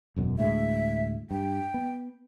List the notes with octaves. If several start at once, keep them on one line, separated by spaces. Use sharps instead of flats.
E1 F#2 B2
D2 A2 G#3 E5
G2 G5
B3